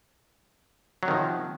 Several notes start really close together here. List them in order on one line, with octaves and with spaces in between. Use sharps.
F#3 C3 D#3 F3